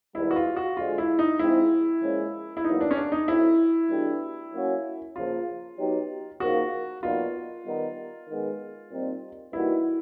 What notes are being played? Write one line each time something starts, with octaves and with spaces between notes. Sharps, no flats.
G#2 D#3 G3 B3 D#4 E4
F#4
F4
F#4
D3 F3 G#3 F4
E4
D#4
G#2 F3 G#3 C4 E4
A#2 F3 G#3 C#4
E4
E2 B2 F#3 A#3 D#4
D4
C#4
D4
D#4
F#3 A3 C4 E4
B2 F#3 A3 D4 G4
F#3 A#3 C#4 F#4
C#3 F3 A#3 F4
F#3 B3 D#4 G4
C#3 F3 A#3 D#4 F#4
A#2 F#3 B3 D#4 F4
D#3 G3 B3 D#4
D#3 G#3 B3
A#2 G3 C4 D#4
E3 G3 A#3 D#4 E4 F#4